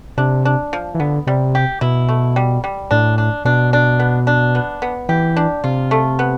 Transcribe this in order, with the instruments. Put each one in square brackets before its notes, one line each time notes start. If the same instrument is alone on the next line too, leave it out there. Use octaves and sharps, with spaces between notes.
[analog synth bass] C3 [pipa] D4
[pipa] D4
F3
[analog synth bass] E3
[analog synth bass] D3 [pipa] B3
[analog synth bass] C3 [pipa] G3
[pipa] G4
[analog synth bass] B2 [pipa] E4
[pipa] A3
G3
G3
[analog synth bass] A2 [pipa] D4
[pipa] D4
[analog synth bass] B2 [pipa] D4
[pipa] D4
B3
D4
B3
B3
[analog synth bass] E3 [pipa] G4
[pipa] D4
[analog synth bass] C3 [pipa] F4
[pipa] A3
B3